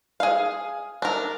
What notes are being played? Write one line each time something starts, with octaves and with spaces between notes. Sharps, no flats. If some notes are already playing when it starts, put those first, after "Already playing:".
G#4 F5
D4 A#4